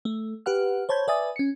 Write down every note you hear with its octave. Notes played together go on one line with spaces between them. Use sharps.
A3
G4 B4 F#5 F6
C5 C#5 A5 B5 G6 G#6
B4 D5 E5 G#5 D#6 A6
C#4 C#7